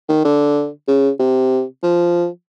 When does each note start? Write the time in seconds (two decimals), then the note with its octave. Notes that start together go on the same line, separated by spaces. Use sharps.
0.09 D#3
0.25 D3
0.88 C#3
1.19 C3
1.83 F3